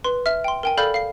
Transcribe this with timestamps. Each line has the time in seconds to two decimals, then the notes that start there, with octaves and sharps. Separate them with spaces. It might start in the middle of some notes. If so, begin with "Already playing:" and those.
0.04 B4 C6
0.26 E5 F6
0.44 G5 C6
0.63 A#4 G5 G#5
0.78 A4 D5 F5 B5 F6 G6
0.94 F5 C7